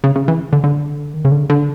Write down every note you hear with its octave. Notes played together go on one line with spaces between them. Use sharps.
C#3
C#3
E3
D3
D3
D#3
C#3
D3
D3